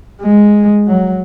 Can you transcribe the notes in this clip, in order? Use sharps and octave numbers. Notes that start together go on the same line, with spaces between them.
G#3
F#3